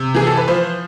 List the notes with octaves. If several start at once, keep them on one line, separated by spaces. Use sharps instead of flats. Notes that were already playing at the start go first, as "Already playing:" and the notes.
Already playing: C3
E3 G#4
A4
B4
F3 C5